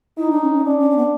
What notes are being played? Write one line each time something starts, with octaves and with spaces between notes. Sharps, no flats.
D#4 E4
D4
C#4
C#4
C#4 D4
C#4
C#4
B3